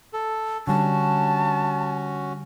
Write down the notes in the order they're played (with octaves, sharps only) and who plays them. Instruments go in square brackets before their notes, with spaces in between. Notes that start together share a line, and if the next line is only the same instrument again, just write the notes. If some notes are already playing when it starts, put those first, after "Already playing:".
[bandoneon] A4
[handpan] D3 G3 [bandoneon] C#4 F#4 [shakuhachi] A5